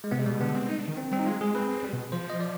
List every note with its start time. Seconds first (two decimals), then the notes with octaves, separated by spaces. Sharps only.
0.04 G#3
0.11 C3 B3
0.19 G#3
0.26 B2 G3
0.40 D3 B3
0.55 C4
0.68 D#4
0.79 D4
0.88 D#3
0.97 C4
1.11 G3 C4
1.19 D#4
1.26 G#3 F4
1.41 G#3 G#4
1.55 C4 B4
1.69 C4
1.83 G3
1.93 B2
2.12 F3 C5
2.30 D#5
2.41 D5